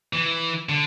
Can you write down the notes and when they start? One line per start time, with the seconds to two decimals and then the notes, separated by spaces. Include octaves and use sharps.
0.13 E3
0.69 D3